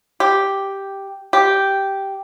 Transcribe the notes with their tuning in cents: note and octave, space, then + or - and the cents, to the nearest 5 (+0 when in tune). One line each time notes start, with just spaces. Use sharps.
G4 +0
G4 -5